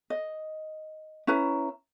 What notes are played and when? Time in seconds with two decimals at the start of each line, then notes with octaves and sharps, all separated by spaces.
0.10 D#5
1.27 C#4 E4 B4 A#5